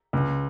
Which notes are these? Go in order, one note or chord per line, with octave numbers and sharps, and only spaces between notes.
C#2